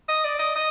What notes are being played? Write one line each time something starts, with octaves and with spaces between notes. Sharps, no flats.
D#5
D5
D#5
D#5